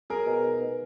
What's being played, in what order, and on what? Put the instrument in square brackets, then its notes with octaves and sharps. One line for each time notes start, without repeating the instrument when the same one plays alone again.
[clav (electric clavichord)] F#3 [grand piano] G#4 A#4
[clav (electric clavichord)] B2
D#4
B3